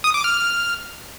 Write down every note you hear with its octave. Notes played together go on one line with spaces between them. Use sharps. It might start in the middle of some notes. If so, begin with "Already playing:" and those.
D#6
D6
F6